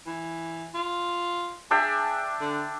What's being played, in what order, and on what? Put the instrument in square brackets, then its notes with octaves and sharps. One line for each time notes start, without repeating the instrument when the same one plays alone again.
[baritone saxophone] E3
F4
[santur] D4 E5 G5 [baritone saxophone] G#4
[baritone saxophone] D3